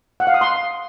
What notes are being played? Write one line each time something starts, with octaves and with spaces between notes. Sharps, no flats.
F#5
F5
D#6
C6